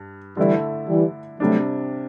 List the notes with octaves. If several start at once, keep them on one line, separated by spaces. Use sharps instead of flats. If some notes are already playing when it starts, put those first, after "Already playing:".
Already playing: G2
D3 E3 G3 A3 E4
E3 G3
C3 F#3 G3 A3 D4